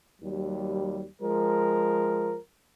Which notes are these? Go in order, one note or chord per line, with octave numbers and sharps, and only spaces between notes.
D#2 F#3 G3
F3 G#3 A#4